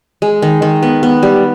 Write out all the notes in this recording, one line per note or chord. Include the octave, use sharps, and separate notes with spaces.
G#3
D#3
D#3
B3
B3
G3